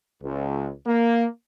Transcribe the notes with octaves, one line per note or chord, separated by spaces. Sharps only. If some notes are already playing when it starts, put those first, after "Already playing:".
C#2
A#3